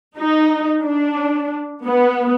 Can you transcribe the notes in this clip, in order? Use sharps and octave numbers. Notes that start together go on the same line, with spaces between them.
D#4
D4
B3